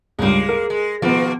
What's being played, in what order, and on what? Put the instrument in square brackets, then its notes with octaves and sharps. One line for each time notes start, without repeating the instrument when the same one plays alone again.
[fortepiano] C#2 G2 [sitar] G#3 A#3
[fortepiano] A#4
[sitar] G#3
[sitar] B2 D#3 A#3 [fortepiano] F3 B3